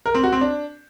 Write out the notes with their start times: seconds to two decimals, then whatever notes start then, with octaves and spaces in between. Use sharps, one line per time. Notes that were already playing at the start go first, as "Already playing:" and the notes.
0.06 A#4
0.14 C4
0.23 F#4
0.32 C4
0.41 D4